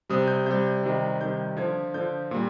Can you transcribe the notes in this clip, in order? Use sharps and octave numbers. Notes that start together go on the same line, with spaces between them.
C3 G3 D#6
G6
C3 G3 G6
C3 D#3 G3
C3 D#3 G3 G6
D3 F3 G#6
D3 F3 G6
A#2 G3